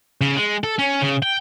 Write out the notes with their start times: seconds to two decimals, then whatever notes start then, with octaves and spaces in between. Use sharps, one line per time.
0.21 C#3
0.36 G#3
0.64 A4
0.79 C#4
1.01 C#3
1.23 G5